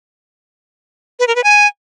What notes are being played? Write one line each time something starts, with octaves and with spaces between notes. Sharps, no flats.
B4
A#4
B4
G#5